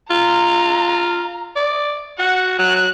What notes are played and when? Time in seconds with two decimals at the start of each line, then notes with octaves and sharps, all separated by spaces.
0.10 F4 A#5
1.56 D5
2.19 F#4 F#5
2.59 F#3 F#6